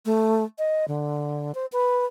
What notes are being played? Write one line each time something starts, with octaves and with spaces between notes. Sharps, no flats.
A3
D#5
D3
C5
B4